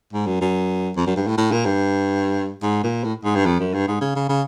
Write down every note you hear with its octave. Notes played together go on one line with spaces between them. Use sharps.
G#2
F#2
F#2
F2
F#2
G2
A2
A2
A#2
G2
G#2
A#2
A2
G#2
G2
F2
F#2
G2
G#2
C#3
C#3
C#3